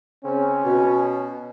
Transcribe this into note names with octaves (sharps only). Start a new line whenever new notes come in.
C#3 C4 C#4
B2